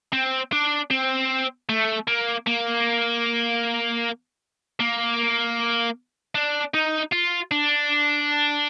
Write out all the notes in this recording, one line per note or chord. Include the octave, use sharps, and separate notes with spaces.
C4
D4
C4
A3
A#3
A#3
A#3
D4
D#4
F4
D4